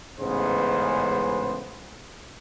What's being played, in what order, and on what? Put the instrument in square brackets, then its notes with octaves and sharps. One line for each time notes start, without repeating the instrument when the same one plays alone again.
[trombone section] A1 G#2 C#3 G#3 B3 C5